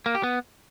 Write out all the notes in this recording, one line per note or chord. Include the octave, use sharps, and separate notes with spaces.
A#3
G4
B3